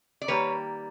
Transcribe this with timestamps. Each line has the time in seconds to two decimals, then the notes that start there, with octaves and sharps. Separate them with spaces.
0.22 D5
0.28 D#3 G3 A#3 B4 C#5